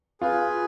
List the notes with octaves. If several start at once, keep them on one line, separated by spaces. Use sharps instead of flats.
F4 G#4 B4